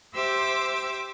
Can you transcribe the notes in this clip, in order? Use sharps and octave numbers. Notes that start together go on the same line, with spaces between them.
G4 C5 E5 D6 E6